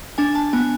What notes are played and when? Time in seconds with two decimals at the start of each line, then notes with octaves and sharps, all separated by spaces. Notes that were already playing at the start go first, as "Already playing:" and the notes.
0.18 D4 G#5
0.35 A5
0.53 B3 G#5